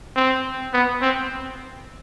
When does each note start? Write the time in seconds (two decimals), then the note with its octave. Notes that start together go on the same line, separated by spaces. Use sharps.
0.16 C4
0.74 B3
1.02 C4